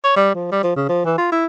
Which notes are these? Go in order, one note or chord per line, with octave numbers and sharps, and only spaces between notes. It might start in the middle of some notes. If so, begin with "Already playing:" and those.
C#5
G3
F3
G3
F3
C#3
F3
E3
F4
E4